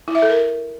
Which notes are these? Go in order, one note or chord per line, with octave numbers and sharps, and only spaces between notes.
E4
E5
A4
A#4